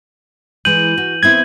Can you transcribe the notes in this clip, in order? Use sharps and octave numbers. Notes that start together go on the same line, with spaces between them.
E3 G#3 G6 D#7 F#7
F#4
B3 C4 E4 G#6